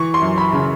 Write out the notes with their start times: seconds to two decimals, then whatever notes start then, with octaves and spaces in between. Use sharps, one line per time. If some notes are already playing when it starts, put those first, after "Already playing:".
Already playing: E3 C#6
0.14 C6
0.22 F#2
0.38 B5
0.53 C#3